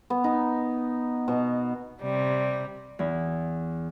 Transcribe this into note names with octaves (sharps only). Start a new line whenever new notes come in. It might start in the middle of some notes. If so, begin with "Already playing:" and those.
B3
D#4
B2
C3 G3
E2 E4